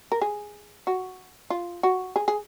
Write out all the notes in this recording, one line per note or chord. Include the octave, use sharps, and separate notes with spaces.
A#4
G#4
F#4
F4
F#4
G#4
G#4